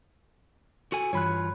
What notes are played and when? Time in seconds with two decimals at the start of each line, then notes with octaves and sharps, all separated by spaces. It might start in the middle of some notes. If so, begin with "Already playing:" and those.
0.92 F#4 A4 G#5
1.13 G2 E3 F4 C#5 B5 F#6